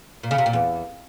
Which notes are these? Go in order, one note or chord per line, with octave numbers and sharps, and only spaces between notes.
A#2
C#3
C3
A#2
E2